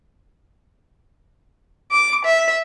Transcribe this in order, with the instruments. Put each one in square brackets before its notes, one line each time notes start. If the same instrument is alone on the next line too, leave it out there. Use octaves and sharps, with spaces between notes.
[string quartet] D6
E5